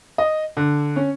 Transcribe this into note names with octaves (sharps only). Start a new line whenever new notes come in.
D#5
D3
C#4